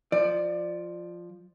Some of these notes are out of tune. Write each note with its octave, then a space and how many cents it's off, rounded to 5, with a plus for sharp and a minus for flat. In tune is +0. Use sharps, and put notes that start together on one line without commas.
F3 +0 D5 +25